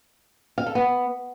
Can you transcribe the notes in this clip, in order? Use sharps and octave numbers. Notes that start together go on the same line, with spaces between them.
F5
A4
B3